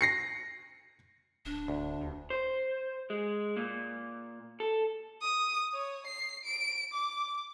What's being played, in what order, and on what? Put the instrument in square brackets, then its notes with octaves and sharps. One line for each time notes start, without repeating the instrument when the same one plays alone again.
[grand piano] A#6 C7 C#7
[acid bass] D1 [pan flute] D4
[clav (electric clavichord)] D2
[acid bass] D#2
[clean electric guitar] C5
G#3
A#2
A4
[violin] D#6
C#5
C7
D7
D6